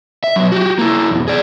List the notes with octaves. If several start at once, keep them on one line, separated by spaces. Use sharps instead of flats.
E5
F#3 B3
F#4 G4
A#3 E4
B1 E2
G#4 D5